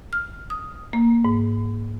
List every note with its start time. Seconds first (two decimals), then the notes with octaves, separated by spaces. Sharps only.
0.13 F6
0.50 D#6
0.93 A#3
1.25 G#2